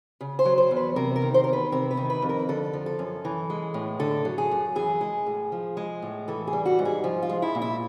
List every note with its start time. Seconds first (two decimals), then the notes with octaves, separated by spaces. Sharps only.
0.21 C#3
0.39 C5
0.45 F#3
0.58 C5
0.71 E2
0.77 B4
0.96 C3 A#4
1.16 A#4
1.22 D#3
1.34 C5
1.44 E2 A#4
1.53 B4
1.72 C3 A#4
1.91 B4
1.97 D#3
2.10 B4
2.22 F2
2.29 A#4
2.49 D3 A4
2.73 F3
2.86 A4
2.99 F#2
3.25 E3
3.50 G#3
3.74 A2
4.00 D3 A4
4.25 F#3
4.38 G#4
4.51 F#2
4.75 E3 G#4
5.01 G#3
5.26 A2
5.52 F3
5.77 G#3
6.02 A2
6.28 E3 A4
6.47 G#4
6.53 G3
6.66 F#4
6.79 G#2
6.85 G#4
7.04 F3
7.23 F4
7.29 G#3
7.42 E4
7.55 A#2
7.62 E4